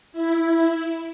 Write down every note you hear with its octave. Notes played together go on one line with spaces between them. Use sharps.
E4